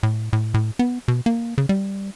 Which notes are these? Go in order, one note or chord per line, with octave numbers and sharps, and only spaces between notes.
A2
A2
A2
B3
B2
A#3
C#3
G3